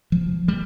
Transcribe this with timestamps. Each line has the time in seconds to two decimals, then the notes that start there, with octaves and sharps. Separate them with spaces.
0.12 F3
0.48 G3